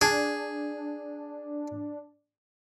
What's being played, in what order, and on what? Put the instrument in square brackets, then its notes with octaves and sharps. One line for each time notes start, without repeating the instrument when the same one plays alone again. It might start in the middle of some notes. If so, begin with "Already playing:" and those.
[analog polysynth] D4 [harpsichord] G#4